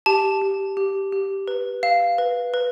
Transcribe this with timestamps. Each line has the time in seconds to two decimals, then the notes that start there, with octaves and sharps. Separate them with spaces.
0.06 G4 A5
0.42 G4
0.77 G4
1.12 G4
1.48 B4
1.83 F5
2.18 B4
2.54 B4